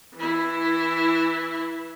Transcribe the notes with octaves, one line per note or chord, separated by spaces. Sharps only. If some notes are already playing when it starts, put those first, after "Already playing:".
E3 E4